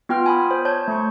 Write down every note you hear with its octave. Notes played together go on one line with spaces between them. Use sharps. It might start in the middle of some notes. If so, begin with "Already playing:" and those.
B3 F4 G5 C6 F6
G#5 B5 D#6
C5
C#5 A5 G6 G#6
A3 C6 C#6